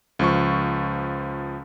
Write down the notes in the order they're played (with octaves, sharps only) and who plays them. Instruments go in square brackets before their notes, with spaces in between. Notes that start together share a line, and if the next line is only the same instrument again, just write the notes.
[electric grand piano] C#2 F3 C#6